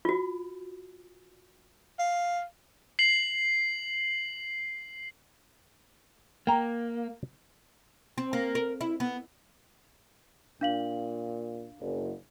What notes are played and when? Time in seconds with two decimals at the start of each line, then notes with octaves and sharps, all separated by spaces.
0.05 F4 F#4
1.99 F5
2.99 C7 F#7
6.47 A#3 G5 A#5
8.18 C4
8.33 A#3
8.55 A#4
8.81 E4
9.00 B3
10.61 A#2 D4 F5 F#7
11.80 F#1